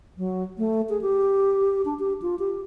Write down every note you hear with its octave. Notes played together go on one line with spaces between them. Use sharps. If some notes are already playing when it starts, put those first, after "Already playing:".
F#3
A3
G#4
G4
D4
G4
F4
G4